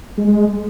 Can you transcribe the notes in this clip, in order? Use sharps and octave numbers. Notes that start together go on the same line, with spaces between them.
G#3